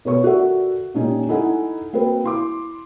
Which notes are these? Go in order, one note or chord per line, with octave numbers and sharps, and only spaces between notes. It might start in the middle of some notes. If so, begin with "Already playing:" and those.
B2 B4 C#5 C#6
F#4 A4 A#4 D5 E5 F#5
A#2 G#3 C#4 D#4 G4
D#4 E4 A4 F#5 G#5
A#3 C4 F#4 A#4 B4
E4 C6 D6